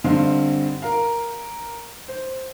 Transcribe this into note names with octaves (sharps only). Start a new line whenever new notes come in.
G2 D3 C4 D#5 F5 C6
A#4 F5
C5